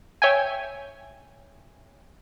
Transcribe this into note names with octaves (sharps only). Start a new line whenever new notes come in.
C#5 E5 G5 G#5